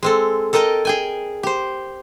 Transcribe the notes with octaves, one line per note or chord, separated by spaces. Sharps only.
G#3 C4 A4
A4 A#4 D#5 G5 A5
G#4 G5 G#5
G4 C5